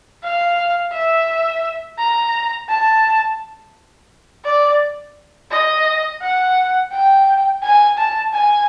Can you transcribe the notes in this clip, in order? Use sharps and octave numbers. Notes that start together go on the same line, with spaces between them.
F5
E5
A#5
A5
D5
D#5
F#5
G5
G#5
A5
G#5